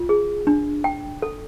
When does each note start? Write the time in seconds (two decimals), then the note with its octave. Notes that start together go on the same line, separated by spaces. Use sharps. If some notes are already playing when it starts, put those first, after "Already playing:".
Already playing: F4
0.09 G#4
0.47 D4
0.84 G5
1.22 A4